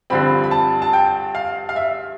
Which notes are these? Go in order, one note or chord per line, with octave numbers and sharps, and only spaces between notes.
G2 D3 F3 C4 B5
B5
A5
A5
G5
F5
F5
E5